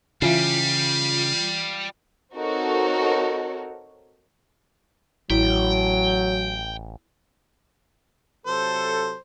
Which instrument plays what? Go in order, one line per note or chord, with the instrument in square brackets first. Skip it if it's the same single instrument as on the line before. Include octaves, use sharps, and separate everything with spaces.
[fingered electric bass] C#3 [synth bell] E3 F4 C7 [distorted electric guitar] G3 [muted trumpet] F5
[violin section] C4 D#4 F#4 A4 A#4 C#5
[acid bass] A1 [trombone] F#3 [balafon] E4 [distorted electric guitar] G5
[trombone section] C3 F#3 A4 [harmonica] C5